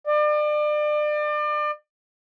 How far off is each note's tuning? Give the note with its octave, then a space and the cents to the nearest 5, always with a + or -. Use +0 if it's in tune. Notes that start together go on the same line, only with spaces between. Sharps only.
D5 +35